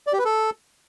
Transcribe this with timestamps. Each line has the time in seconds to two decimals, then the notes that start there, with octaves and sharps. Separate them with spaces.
0.07 D5
0.13 G4
0.19 B4
0.25 A4